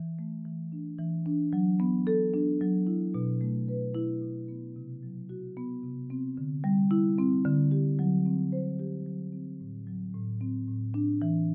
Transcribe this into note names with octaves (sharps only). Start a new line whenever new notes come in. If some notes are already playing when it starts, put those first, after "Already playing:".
Already playing: E3
A3
E3
D4
E3
D4
F#3
B3
A4
D4
F#3
E4
B2
A3
B4
E4
B2
B3
C3
F#3
F#4
B3
C3
C4
D3
G3
E4
C4
D3
G4
F#3
C4
C5
G4
F#3
C4
A2
F#3
A2
C4
A2
D4
E3